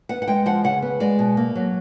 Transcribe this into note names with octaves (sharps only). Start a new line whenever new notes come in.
B3 F#5
F#5
G#3 G5
F3 F#5
C#3 F#5
B3
G#3 D5
B2
A#3
F#3